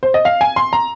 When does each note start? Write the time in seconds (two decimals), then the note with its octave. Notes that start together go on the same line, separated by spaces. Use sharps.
0.03 C5
0.14 D#5
0.25 F5
0.41 G#5
0.56 C6
0.73 A#5